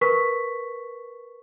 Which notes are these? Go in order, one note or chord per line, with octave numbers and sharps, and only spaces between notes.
A#4 B4 C#6 B6